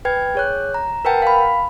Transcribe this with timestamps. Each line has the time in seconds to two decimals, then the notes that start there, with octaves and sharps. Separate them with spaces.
0.05 B4 G5 G#6
0.35 G#4 C#5 F#6
0.74 A#5
1.05 A#4 B4 F#5 G5 A5
1.22 F5 B5